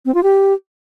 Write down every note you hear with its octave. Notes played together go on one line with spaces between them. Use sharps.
C4
F4
G4